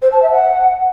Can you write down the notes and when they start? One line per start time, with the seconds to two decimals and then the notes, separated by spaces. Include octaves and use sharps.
0.02 C5
0.12 A5
0.22 E5
0.32 F#5